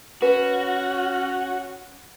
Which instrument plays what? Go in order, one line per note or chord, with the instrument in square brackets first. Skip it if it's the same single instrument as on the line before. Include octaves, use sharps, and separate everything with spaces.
[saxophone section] C#4 [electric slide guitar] F#4 [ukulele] B4